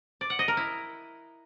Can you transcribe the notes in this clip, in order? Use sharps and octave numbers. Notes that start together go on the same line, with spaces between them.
D5
F#5
D#5
A#4
E4